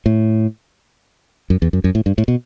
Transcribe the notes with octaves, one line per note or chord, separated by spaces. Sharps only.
A2
F#2
E2
F#2
F#2
A2
G2
A2
B2